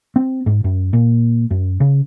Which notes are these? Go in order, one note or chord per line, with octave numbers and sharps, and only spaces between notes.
C4
G#2
F#2
A#2
F#2
C#3